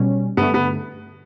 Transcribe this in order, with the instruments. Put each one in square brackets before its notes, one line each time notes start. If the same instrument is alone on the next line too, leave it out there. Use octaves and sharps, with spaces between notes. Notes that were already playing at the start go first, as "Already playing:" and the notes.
Already playing: [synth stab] B2 G3 C#4
[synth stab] G2 D3 A3 [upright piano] B3
[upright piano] B3